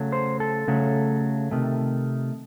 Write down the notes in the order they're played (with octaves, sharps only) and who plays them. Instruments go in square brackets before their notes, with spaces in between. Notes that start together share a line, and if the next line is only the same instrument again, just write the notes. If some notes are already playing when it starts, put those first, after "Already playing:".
Already playing: [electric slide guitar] C#3 F#3 A3
C5
A4
C#3 F#3 A3
C3 D#3 A3